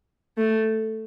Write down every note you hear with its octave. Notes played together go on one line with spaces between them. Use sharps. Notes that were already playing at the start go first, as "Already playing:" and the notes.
A3